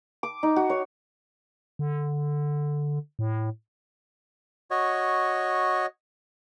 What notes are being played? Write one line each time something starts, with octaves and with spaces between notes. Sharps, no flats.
D6
D#4
F#4
C#5
D3
A2
F#4 C#5 D#5